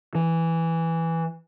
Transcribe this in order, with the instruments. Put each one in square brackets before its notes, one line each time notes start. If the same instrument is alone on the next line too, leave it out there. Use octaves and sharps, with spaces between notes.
[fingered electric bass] E3